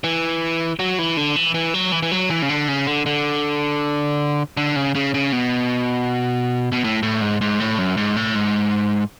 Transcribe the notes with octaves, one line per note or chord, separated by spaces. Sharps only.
E3
F#3
E3
D3
E3
E3
F#3
E3
E3
F#3
E3
C#3
D3
C#3
D3
D3
D3
C#3
C#3
C#3
B2
B2
A2
A2
G#2
G#2
A2
F#2
G#2
A2
G#2